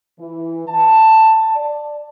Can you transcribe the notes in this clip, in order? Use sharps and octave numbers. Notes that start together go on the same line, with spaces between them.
E3
A5
D5